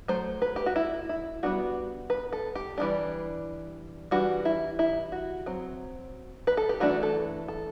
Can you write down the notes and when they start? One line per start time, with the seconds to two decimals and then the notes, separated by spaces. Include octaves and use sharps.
0.08 F#3 A3 C5
0.42 B4
0.56 G4
0.66 F#4
0.76 E4
1.09 E4
1.43 G3 B3 D4 F#4
2.10 B4
2.33 A4
2.55 G4
2.78 E3 G3 D4
4.11 E3 G3 D4 F#4
4.45 E4
4.79 E4
5.12 F#4
5.46 F#3 C4
6.47 B4
6.57 A4
6.69 G4
6.80 E3 A3 D4 F#4
7.03 A4
7.48 A4